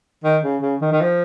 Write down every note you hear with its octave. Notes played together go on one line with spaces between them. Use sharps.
D#3
C#3
C#3
D#3
D#3
F3